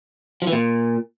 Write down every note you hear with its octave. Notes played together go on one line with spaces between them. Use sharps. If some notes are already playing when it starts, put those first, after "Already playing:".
F3
E3
A#2